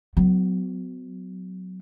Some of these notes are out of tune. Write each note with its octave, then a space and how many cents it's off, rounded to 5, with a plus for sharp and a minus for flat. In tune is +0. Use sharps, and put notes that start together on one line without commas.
F#3 +0 B3 +40